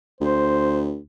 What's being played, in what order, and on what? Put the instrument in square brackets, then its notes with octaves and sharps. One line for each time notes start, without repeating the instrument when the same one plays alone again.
[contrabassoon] D2 [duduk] C5